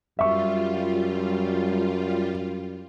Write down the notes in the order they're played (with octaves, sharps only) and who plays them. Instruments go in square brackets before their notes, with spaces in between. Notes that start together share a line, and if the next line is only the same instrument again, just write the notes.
[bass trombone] F#2 [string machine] G3 F4 [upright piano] E5 C#6